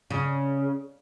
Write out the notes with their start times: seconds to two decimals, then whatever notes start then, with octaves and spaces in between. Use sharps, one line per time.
0.10 C#3